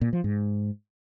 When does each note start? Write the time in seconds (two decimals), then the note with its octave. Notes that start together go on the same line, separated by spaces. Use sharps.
0.01 A#2
0.13 F3
0.24 G#2